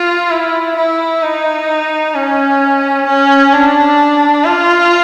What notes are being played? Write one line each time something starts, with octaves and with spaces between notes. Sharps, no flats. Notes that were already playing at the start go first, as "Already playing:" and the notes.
Already playing: F4
E4
E4
D#4
C#4
C#4
D4
F4